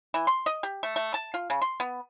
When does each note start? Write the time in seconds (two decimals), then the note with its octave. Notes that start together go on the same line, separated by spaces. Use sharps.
0.14 E3
0.27 C6
0.46 D#5
0.63 G4
0.83 A3
0.96 A3
1.14 A5
1.34 F4
1.50 C#3
1.62 C6
1.80 B3